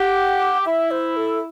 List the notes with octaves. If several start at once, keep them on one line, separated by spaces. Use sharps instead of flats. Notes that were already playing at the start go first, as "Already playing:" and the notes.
Already playing: G4 F#5
E4 E5
C5
A4